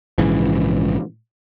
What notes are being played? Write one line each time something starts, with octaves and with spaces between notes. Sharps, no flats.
A#1 G#2 C#3 E3